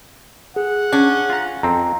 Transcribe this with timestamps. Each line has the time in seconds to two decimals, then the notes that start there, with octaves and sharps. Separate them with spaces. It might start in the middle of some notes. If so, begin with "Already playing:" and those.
0.56 G#4 F#5
0.93 C#4 D4
1.30 F4 A#5
1.63 F2 C4 A#5